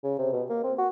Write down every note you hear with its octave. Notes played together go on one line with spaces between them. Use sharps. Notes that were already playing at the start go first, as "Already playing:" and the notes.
C#3
C3
B2
A#3
C4
F#4